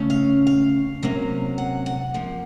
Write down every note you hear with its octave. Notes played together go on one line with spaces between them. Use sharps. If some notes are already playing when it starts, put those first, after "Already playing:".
Already playing: C#3 A3 C#4
F5
F5
C3 F#3 A#3 C#4
F#5
F#5
C3 F3 A#3